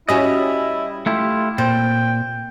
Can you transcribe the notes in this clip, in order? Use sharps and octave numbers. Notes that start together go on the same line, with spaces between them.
G3 C#4 E4 F#4 D#5
A3 E4 F4 G4
A#2 C4 G5